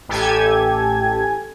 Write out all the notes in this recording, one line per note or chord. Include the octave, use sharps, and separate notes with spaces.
A1 G4 A4 G#5 G#6